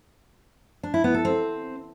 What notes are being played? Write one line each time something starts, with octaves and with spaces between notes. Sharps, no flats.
D4
E4
B3
A4
C4